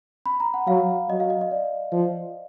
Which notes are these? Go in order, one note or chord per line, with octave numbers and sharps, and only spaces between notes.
B5
A#5
F#5
F#3 F5
F#3 D#5
F5
D#5
D#5
D5
F3